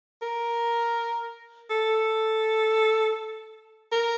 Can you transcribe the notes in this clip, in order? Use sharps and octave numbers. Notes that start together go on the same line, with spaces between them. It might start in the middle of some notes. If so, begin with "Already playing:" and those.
A#4
A4
A#4